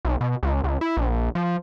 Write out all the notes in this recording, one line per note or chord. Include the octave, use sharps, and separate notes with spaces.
B1
B2
C#2
C#2
E4
A#1
F3